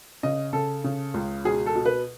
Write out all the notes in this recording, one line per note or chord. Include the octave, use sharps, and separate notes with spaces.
C#3 D#5
C#3 A4
C#3
C#2
B2 G#4
A4
B2
B4